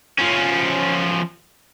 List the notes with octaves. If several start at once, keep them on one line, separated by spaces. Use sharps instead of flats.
F3 C#4